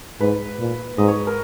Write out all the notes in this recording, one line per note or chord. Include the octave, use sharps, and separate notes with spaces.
G#2 B4
A#2
G#2 D#5
C#5
A#4